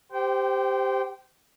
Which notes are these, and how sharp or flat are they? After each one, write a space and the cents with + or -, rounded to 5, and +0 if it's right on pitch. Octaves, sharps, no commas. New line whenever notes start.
G4 +5 C5 -15 G5 -25